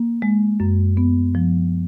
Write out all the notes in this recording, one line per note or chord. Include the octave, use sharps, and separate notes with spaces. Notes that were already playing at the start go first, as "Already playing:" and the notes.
Already playing: A#3
G#3
F#2
B3
F3